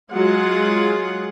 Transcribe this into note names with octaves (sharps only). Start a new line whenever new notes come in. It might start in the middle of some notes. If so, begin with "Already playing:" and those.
F#3 G#3 F4 G#4 F#5